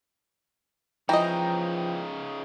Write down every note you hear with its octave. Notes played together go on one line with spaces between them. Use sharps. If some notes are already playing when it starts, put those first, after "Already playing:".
C#3 E3 F3 D#4 D#5 G5 A#5